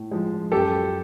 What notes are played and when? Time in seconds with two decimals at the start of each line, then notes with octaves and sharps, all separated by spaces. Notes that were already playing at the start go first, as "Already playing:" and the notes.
Already playing: A2
0.11 F3 G#3
0.52 F#2 G4 A4